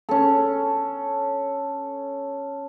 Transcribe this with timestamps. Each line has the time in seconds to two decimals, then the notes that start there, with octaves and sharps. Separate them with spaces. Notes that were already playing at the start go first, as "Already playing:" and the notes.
0.09 C#4 A4